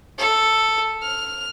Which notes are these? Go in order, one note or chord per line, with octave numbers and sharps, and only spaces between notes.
A4
F6